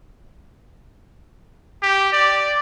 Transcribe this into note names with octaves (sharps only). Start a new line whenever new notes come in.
G4
D5